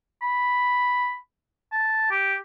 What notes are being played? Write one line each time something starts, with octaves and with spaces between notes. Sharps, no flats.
B5
A5
G4